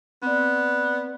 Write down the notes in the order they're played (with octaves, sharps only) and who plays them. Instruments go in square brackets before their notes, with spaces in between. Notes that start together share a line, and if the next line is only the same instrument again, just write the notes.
[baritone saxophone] B3 [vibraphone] C4 D5